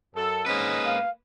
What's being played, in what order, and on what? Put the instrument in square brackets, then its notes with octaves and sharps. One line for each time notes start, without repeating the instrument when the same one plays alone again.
[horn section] F#2 A4
[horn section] G#2 C#4 D#5 [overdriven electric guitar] A#3 B4
[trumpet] F5